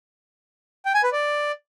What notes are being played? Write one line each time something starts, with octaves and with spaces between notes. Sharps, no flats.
G5
G#5
B4
D5